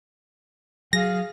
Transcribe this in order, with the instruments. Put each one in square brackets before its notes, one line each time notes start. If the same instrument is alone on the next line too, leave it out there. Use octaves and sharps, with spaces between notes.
[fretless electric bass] F#3 [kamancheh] G#4 F5 [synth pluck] A#6